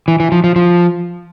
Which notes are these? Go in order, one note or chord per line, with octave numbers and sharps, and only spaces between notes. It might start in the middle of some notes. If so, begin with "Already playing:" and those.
E3
E3
F3
F3
F3